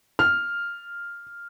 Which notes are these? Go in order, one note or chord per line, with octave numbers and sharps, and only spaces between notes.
F6